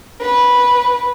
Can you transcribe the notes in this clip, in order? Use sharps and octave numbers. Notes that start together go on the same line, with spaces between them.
B4